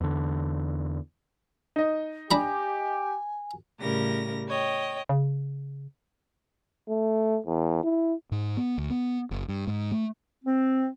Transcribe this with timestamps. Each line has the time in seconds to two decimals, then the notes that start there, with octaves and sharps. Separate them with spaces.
0.01 E2 D3
1.76 D#4 D#5
2.31 D4 G4 G#5 A#5 B5
3.80 A2 C#3 G3 A#4 A#6
4.49 C#5 D#5 G5
5.09 C#3
6.89 A3
7.46 E2
7.83 E4
8.32 G#2
8.57 B3
8.78 D2
8.90 B3
9.31 F#1
9.48 G2
9.67 G#2
9.92 A3
10.45 C4